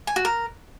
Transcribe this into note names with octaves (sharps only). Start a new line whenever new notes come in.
G#5
F#4
A#4